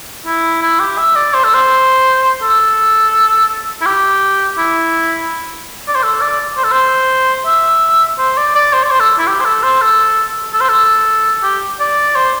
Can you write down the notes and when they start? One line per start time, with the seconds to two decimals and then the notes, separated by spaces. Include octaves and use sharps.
0.26 E4
0.62 E4
0.79 G4
0.98 E5
1.16 D5
1.34 C5
1.44 A4
1.54 C5
2.42 A4
3.81 E4
3.86 G4
4.58 E4
5.88 D5
5.95 C5
6.03 A4
6.21 D5
6.57 C5
6.64 A4
6.72 C5
7.46 E5
8.19 C5
8.37 D5
8.55 D5
8.73 C5
8.84 D5
8.91 C5
9.00 A4
9.19 E4
9.27 G4
9.41 C5
9.45 A4
9.63 C5
9.82 A4
10.53 A4
10.61 C5
10.69 A4
11.43 G4
11.80 D5
12.16 C5